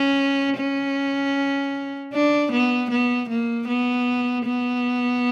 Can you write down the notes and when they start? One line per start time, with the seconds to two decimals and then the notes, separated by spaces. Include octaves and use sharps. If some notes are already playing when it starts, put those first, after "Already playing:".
Already playing: C#4
0.57 C#4
2.13 D4
2.52 B3
2.91 B3
3.29 A#3
3.68 B3
4.45 B3